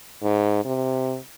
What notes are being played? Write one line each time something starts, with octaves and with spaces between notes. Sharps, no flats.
G#2
C3